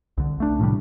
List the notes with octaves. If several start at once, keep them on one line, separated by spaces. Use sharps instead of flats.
C2 D3
A3 D4
A2 C3 D#3 G3